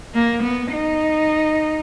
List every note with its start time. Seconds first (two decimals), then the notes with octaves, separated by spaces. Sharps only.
0.14 A#3
0.43 B3
0.71 D#4